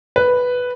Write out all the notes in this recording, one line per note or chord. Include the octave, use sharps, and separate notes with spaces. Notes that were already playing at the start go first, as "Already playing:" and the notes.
B4